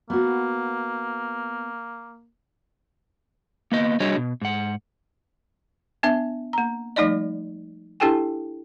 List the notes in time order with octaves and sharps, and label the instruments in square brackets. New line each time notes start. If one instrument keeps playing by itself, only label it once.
[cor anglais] A#3 [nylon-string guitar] B3 F#4
[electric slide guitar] A#3 B3 D#5
G3 D4 F#4 G#4 C#5 D#5
B2
G#2 F#5
[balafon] B3 D4 E5
A#3 A#5
F3 G3 A3 D#4 D5 D#5
D4 E4 G4 A4 G5 G#5